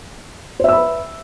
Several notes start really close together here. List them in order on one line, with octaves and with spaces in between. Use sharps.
C5 E5 E6 B5 B4